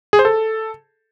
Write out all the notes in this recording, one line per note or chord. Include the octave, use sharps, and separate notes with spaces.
G#4
C5
A4